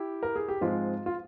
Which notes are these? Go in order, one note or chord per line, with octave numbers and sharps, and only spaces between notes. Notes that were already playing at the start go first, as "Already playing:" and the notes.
Already playing: E4 G4
A#4
G#4
G4
G#2 F3 G#3 C4 F4
F4